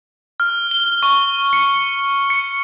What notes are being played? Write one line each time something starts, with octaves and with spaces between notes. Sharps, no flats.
F6
G7
C#6
C#7
C#7